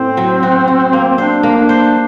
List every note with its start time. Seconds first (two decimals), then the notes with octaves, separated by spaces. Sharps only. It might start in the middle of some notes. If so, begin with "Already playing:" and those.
Already playing: A2 C4
0.17 F#3
0.43 F#4
0.68 F#4
0.93 A#3
1.08 C4
1.18 D4 C5
1.43 A#3
1.57 D4
1.69 C5